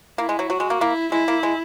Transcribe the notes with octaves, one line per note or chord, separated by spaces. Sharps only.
A#3 E4
G#3
F#3
F#3 F#4
G#3
A#3
A#3 E4
G#3 E4
A#3
G#3